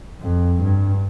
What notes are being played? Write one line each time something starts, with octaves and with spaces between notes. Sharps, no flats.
F2
G2